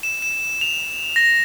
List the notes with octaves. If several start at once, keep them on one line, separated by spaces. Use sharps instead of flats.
E7
E7
F7
A#6